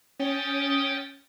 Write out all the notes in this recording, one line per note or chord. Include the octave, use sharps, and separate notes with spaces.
C#4 G5 D#6 A6